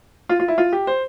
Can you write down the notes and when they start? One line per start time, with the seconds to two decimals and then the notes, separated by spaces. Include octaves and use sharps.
0.29 F4
0.40 F4
0.48 E4
0.58 F4
0.73 G4
0.87 C5